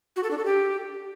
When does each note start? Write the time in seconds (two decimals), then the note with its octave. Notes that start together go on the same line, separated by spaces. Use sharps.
0.16 F#4
0.23 A4
0.31 D4
0.38 A4
0.45 G4